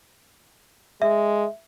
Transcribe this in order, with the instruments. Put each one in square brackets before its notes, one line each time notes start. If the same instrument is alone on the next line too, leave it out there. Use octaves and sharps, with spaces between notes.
[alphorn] G#3 [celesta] E5